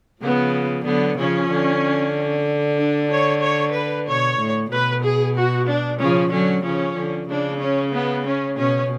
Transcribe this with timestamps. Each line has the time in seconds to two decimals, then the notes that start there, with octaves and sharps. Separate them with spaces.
0.22 C#3 F3 B3
0.86 D3 F#3 B3
1.18 C#3 F3 C#4
1.51 D3
2.79 D4
3.12 C#5
3.43 C#5
3.76 B4
4.08 B2 C#5
4.40 A2
4.71 B2 B4
5.04 G#4
5.36 F#4
5.69 D4
6.00 C#3 F3 C#4
6.32 D3 F#3 C#4
6.64 C#3 F3 C#4
6.97 D3
7.30 C#3 D4
7.62 C#4
7.94 B3
8.26 C#4
8.58 B2 C#4